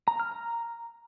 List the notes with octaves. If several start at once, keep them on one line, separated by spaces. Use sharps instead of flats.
A#5
F6
A#5